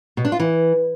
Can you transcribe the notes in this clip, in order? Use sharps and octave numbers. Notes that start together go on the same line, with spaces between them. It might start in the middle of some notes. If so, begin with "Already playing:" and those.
B2
D4
F4
E3